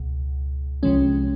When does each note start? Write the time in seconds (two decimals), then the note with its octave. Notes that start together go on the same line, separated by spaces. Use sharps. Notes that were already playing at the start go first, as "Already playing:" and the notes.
Already playing: C#2 B2
0.83 C2 C3 F3 G#3 C#4